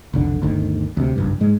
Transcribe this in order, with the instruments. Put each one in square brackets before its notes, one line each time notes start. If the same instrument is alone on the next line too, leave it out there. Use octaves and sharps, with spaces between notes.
[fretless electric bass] F1 B1 D3
G1 D2 D#3
D2 C3
F#1 B1 G2
G#2 G#3